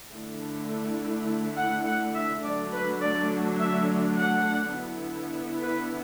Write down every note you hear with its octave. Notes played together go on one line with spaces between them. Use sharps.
D3 A3 E4
F#5
F#5
E5
D3 F#3 A3 D4 D5
B4
D5
E5
F#5
D3 B3 E4
B4